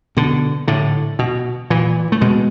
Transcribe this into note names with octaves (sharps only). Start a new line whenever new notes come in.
B2 D3
A2 D3
B2
A#2 E3
A3
B2 G#3